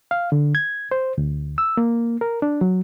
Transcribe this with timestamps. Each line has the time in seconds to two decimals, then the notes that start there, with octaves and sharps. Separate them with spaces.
0.11 F5
0.32 D3
0.55 G#6
0.91 C5
1.18 D2
1.58 E6
1.77 A#3
2.21 A#4
2.42 D4
2.61 F#3